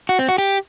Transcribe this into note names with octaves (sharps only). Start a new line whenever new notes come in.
F#4
C4
F#4
G4